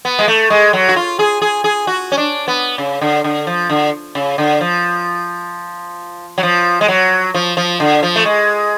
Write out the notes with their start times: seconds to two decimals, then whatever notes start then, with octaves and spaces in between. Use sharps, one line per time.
0.05 B3
0.19 G#3
0.28 A3
0.50 G#3
0.73 F#3
0.89 F#4
0.96 F4
1.19 G#4
1.42 G#4
1.64 G#4
1.87 F#4
2.12 C#4
2.17 D4
2.48 B3
2.78 C#3
3.01 D3
3.24 D3
3.47 F3
3.69 D3
4.15 C#3
4.38 D3
4.61 F3
6.38 F#3
6.43 F3
6.81 G#3
6.88 F#3
7.35 F3
7.57 F3
7.80 D3
8.03 F3
8.16 A3
8.25 G#3